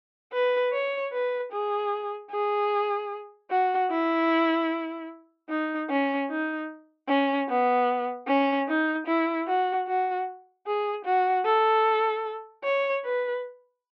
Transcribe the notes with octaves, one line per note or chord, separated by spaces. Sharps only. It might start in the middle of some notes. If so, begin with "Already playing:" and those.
B4
C#5
B4
G#4
G#4
F#4
E4
D#4
C#4
D#4
C#4
B3
C#4
D#4
E4
F#4
F#4
G#4
F#4
A4
C#5
B4